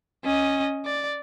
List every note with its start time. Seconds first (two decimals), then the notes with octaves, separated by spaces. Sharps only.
0.24 C#4 D#5
0.85 D5